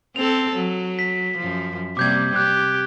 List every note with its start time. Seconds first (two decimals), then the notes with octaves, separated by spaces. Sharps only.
0.16 C4 A4 F7
0.56 F#3
0.99 B6
1.37 F#2 F3
1.97 C3 G3 A#3 D6 G6 G#6
2.36 G4 F#6 G6